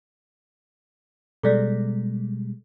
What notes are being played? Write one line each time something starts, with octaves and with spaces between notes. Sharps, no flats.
B2 G3 G#3 A4 D5